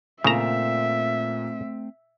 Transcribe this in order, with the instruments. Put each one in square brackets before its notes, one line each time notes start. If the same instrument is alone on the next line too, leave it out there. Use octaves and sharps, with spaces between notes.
[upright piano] A#2 E7 [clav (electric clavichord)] C#3 A#5 [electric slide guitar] A3 C4 [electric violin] E5